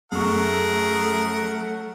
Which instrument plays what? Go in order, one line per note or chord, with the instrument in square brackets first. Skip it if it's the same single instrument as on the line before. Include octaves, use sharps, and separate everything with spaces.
[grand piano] F#2 C#6 [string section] F#3 A3 [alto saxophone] G#4 [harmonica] A#4 F#5